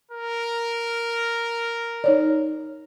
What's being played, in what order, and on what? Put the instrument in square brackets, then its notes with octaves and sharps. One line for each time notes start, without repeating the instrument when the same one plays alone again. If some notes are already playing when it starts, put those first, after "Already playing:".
[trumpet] A#4
[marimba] D#4 C#5 D5